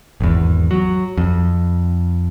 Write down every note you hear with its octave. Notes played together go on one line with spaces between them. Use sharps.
G#1 E2
F#3
F2